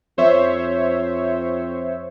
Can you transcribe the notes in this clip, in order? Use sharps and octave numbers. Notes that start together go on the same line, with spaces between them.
F2 C5 C#5 E5